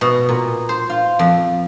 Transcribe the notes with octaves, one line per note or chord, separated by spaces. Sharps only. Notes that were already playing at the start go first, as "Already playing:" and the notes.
B2
A#2
C5
F4
F2